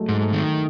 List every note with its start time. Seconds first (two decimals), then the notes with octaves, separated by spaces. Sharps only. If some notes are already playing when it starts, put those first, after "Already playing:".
Already playing: F#3 G#3 A3
0.09 G#2
0.21 A3
0.33 D#3